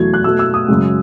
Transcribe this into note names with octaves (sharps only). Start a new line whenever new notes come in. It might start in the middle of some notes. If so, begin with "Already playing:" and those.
Already playing: E2 B2 F#3 A3 G#6
F#6
B2 A3 E6
E6
D#6
F#2 C#3 G#3